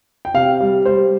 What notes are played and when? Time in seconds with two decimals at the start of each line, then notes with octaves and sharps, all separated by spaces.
0.25 G5
0.34 C3 F5
0.60 G3
0.85 G3 C5